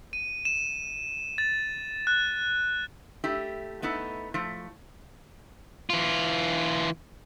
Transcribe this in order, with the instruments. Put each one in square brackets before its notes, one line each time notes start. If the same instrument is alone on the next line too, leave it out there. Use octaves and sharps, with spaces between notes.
[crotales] D#7
E7
A6
F#6
[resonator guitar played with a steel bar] A3 E4 G4
A3 B3 D#4 E4
F3 A3 E4
[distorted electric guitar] E3 F4